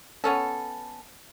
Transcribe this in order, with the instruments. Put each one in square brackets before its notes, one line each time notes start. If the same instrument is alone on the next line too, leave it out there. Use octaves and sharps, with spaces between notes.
[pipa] B3 C#4 A4